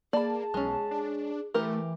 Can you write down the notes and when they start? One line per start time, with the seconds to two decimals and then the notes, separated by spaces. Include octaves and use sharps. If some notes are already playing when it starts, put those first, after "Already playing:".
0.13 A#3 G#4 D5 A5 B5
0.54 B1 G#3 C#4
0.91 D4
1.54 E3 A3 G4 A#4